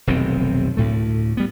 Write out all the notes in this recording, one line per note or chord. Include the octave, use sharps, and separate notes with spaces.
F1 B1 D#3 C4
D2 A2 A3
G3 B3